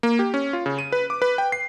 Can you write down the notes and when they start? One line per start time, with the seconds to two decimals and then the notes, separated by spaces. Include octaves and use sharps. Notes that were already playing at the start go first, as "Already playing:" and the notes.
0.03 A#3
0.19 G4
0.34 C#4
0.53 F4
0.66 C#3
0.79 D#7
0.92 B4
1.10 D6
1.22 B4
1.38 G5
1.52 C7